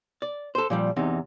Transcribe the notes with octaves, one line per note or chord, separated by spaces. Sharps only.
D5
A4 C5
A#2 F3 G3
E2 C3 D#4